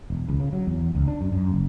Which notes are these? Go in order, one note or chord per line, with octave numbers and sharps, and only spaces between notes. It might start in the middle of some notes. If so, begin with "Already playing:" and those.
E1
C#2
C#3
F#3
E2
C#2
D4
F#2
F#2
F#1